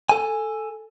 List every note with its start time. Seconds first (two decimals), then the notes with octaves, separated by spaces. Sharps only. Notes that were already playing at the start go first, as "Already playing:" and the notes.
0.09 A4 G#5